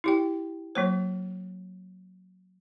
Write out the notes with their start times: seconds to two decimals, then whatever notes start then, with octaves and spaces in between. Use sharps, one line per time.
0.04 E4 G4 G5
0.75 F#3 A#3 C5